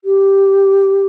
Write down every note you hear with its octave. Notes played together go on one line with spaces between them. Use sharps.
G4